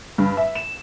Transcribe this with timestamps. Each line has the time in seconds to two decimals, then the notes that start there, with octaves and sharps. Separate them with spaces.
0.18 G2
0.37 E5
0.55 E7